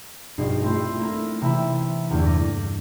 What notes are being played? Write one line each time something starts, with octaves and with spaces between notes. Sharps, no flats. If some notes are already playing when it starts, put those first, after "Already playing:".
A#1 G2 B2 D#4 C7
A3 C4 E4 F4
A#3 E4 A#4
C3 E3 E4 E5 B5 E7
E2 G2 D3 A#3
D6 A6 A#6 D#7